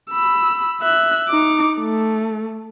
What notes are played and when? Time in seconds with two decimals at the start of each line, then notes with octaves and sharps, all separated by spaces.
0.10 B5 E6
0.82 E5 F#6
1.28 D#4 D6
1.80 A3